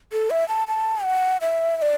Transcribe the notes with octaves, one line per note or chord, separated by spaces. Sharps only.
A4
E5
A5
A5
F#5
E5
E5
D5